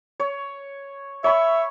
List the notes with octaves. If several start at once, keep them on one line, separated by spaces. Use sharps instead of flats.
C#5
C#5 E5 B5 C#6